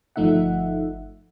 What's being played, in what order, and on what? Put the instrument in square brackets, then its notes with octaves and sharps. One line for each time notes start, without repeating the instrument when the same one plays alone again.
[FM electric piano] G1 F3 A3 D#4 E5 F#5